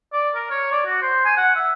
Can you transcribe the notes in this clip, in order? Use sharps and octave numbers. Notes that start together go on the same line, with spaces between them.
D5
A#4
C#5
D5
F#4
C5
G#5
F#5
E5